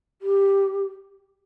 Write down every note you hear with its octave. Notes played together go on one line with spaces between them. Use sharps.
G4